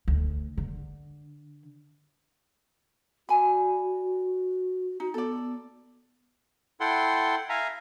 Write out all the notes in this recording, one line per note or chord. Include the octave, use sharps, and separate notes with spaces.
D2
D3
F#4 D5 G#5 B5
D#4 F#4
B3 A4 D5
E4 A4 F#5 G5 C6
E5 F5 G#5 A#5